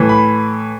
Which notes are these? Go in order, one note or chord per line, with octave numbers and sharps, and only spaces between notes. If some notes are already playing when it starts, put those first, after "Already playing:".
Already playing: A2 E3
B5